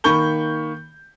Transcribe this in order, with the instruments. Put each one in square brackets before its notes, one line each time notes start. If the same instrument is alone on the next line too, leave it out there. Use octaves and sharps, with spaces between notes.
[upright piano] D#3 A#3 B5 C#6 G6 G7